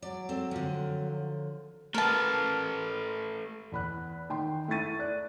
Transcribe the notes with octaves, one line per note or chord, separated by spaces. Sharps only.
F#3 D5
C4 A4
D3 F3
A3 A#4 B4 A5
E2 B5 F#6
D#3 G5 C6
A3 E4 C#6 A6 D#7
D5 F#6